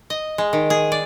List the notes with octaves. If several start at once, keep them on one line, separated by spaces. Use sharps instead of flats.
D#5
G#3
D#3
G#4
D5